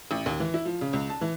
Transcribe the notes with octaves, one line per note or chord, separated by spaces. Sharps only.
A1
D#2
E3
E4
F3
C#3
C#2
A5
E3